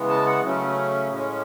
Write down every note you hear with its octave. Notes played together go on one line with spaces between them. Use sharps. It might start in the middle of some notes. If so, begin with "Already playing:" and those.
Already playing: C#3 E3 G#3 B3
A5
F#5
C#3 F#3 A3 C#4
A2 G#3 C#4